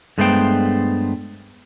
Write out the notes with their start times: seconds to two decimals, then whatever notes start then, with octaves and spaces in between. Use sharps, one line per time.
0.18 G2 G#3 A3 B3 C5 G5